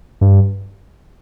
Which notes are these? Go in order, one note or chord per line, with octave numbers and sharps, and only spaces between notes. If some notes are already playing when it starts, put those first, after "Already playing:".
G2